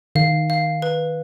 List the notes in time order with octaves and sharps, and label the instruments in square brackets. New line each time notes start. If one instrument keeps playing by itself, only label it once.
[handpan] D#3 [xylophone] F5
[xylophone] F5
B4